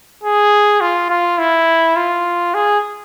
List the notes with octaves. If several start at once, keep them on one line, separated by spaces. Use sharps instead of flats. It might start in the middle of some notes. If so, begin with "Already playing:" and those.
G#4
F4
F4
E4
F4
G#4